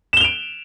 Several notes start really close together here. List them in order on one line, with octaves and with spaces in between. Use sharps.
E7 G7 F7 D7